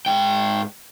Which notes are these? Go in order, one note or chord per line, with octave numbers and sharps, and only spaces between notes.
G#2 G5